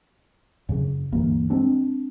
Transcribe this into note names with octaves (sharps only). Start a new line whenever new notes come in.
F#2 C#3
D2 G2 E3 A#3
G#3 C4 D4